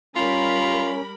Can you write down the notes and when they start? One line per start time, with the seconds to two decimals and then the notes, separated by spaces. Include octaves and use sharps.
0.16 G3 C#4 F4 A#4 B5